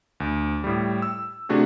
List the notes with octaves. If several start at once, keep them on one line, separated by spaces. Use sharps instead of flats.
D2
A2 G3
E6
C3 A3 D4 F#4 G#4